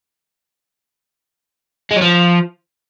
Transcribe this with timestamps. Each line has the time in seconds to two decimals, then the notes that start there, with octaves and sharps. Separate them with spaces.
1.91 G#3
1.96 F#3
2.01 F3